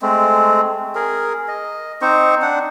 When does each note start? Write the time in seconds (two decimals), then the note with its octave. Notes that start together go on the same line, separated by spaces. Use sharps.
0.02 G#3 A3 C4
0.95 G#4 A#4
1.48 D#5
2.02 C4 D#4 C5 C#6
2.42 D4 F#5